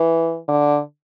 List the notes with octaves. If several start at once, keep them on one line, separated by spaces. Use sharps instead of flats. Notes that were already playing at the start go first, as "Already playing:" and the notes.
Already playing: E3
D3